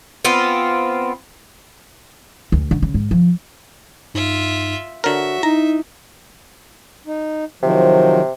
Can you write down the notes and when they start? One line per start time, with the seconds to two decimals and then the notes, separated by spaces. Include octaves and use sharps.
0.24 B3 C4 F4
2.52 D2
2.71 D3
2.82 C#3
2.94 G#2
3.11 F3
4.14 G2 D#4 F4 E5
5.04 D3 F#4 A#4 C#5 E5
5.43 D#4 E4 A#5
7.07 D#4
7.63 C3 D#3 F3 F#3